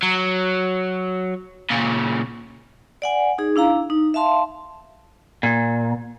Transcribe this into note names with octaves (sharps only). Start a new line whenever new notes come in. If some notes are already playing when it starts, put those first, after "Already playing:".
F#3
A#2 C#3
D5 F#5 G#5
D#4 G#4
D4 E4 F5 A#5
D#4
E5 F5 A5 C6
A#2